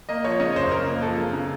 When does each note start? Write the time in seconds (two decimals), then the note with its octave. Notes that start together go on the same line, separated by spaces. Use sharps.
0.09 A#3 D#5
0.25 F3 C#5
0.40 C#3 D#5
0.56 F#2 C5
0.71 C#3 A#4
0.87 A#3
1.02 F3 A4
1.18 C#3
1.33 C#3